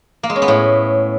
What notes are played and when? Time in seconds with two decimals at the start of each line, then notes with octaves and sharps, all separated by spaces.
0.23 A#3
0.30 G#3
0.36 C#4
0.42 B3
0.48 A2